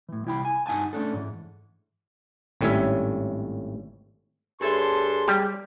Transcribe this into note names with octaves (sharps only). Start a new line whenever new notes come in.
A2 E3
C2 E4 G5 B5
G#5
G2 D#4 F#5 G#5 A5
A3 C#4 D4 A4
G#2 E3
G#1 A2 G3 C#4 C#5 E5
G2 G#4 A4 C#5 E5 C6
G3 G4